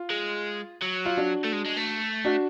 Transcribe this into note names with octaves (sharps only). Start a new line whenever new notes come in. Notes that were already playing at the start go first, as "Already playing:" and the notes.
Already playing: F4
G#3
F#3
F4
D4 F#4
A3
G#3
G#3
A3
D4 F#4